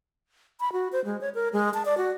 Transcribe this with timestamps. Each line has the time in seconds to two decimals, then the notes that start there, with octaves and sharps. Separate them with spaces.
0.60 B5
0.73 F#4
0.92 C5
1.05 G#3
1.21 C#5
1.35 A#4
1.53 G#3
1.74 A5
1.85 D5
1.98 F#4